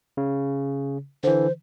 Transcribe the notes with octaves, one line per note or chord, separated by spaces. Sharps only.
C#3
D3 E3 C5